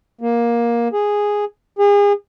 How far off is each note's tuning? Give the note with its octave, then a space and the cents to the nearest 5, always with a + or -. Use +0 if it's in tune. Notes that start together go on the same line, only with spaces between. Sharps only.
A#3 +15
G#4 -5
G#4 -35